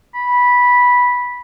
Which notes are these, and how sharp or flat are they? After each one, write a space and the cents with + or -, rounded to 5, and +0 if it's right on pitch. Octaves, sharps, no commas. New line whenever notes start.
B5 -10